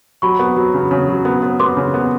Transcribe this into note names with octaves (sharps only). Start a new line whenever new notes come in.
F#3 B5 C#6
B3
F#3
C#3
C#3
F#3
B3
B3
B3 C6 D6
C#3
B3